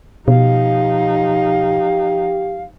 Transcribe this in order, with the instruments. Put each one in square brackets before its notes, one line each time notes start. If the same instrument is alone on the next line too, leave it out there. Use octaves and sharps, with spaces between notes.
[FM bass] B2 [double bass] F3 D#4 [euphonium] G4 [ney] F5